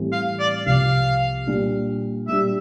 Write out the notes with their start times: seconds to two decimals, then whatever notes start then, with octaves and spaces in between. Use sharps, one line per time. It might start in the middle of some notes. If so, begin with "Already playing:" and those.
Already playing: A2 E3 G3 C4
0.12 F5
0.40 D5
0.66 C2 C3 F3 F5
1.47 A#2 G3 D4
2.28 A#2 G3 D4 E5